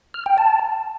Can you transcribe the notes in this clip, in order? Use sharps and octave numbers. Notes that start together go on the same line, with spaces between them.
F6
G5
A5